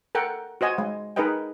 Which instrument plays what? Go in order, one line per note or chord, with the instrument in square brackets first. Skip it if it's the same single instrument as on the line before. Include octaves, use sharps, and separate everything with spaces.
[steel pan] A4 A#4 F#5 G5
F#4 C5 D#5 G#5
G#3
D#4 G#4 A#4 B4 D#5 G5